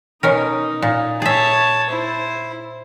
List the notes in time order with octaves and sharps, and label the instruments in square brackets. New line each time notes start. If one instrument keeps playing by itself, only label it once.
[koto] B2 C#4 A#4 [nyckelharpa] D#4
[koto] A#2
[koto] G#4 E5 [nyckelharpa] C#5 A5
[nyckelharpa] E4 C5